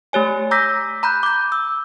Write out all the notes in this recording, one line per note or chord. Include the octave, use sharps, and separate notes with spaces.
A3 G4 C#5 G#5
A#5 D6 E6 G6 A#6 B6
A#5 B5 F#6 G6
D6 G6
E6